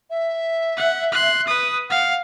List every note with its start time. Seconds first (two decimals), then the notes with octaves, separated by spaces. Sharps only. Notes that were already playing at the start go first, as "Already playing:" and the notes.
0.10 E5
0.77 F#5
1.12 C6 F#6
1.47 B4 D#6
1.90 F5 F#5